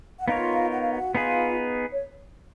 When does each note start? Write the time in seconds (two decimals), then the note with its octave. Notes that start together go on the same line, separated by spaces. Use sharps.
0.20 F#5
0.27 B3 D#4 F4 A#4 C#5 F5
0.72 F#5
0.82 F5
0.92 F#4 F#5
1.15 B3 D#4 F4 G#4 B4 F5
1.92 C#5